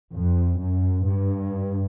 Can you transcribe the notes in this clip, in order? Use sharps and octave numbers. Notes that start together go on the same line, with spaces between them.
F2
F#2
G2